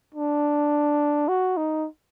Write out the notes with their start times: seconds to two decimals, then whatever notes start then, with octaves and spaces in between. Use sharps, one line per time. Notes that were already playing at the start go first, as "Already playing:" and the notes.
0.15 D4
1.29 F#4
1.57 D#4